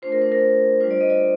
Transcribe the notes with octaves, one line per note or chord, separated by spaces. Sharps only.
A3 D4 F4 C5
A#4
C5
A#4
G3 D4 F4 C5
D5
D#5
D5